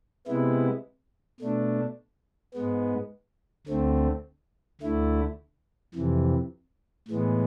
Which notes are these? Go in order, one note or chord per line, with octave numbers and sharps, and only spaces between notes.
C3 G#3 B3 E4
B2 A3 D4
G#2 G#3 B3
D2 D3 A3 C4
D2 D3 A3 E4
F2 C3 E3
A2 E3 G#3 B3